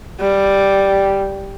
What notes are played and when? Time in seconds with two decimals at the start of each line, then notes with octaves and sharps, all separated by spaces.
0.21 G3